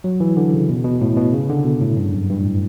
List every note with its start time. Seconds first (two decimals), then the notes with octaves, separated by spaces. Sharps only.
0.04 F#3
0.20 E3
0.37 D3
0.54 C#3
0.69 B2
0.84 B2
1.01 A2
1.17 B2
1.33 C#3
1.49 D3
1.65 B2
1.81 A2
1.97 G2
2.13 F#2
2.30 G2
2.41 A2